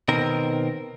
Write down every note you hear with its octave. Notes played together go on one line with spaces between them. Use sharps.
B2 D#3 C4 A#4